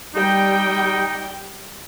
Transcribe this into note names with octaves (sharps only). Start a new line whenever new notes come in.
G3 D#4 G5